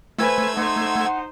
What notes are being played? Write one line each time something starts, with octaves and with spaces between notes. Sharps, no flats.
A3 B4 C5 G#5 E6 G#6
D#4 C5 F#5 C6